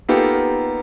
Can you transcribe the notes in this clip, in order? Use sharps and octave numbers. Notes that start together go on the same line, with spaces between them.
A#3 B3 D#4 F4 G4 A4